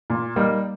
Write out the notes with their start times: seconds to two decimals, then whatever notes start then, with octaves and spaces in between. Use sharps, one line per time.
0.10 A#2
0.36 G3 A#3 D#4